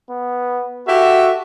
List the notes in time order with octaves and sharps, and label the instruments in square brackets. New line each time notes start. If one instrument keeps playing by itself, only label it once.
[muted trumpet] B3
[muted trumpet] F#4 [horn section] G4 A4 E5